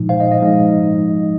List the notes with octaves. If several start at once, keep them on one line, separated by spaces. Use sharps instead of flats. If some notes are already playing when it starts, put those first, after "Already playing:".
Already playing: A#2 F3 G#3 D#4
C5 F5
D#5
D#5
F3 G#3 D#4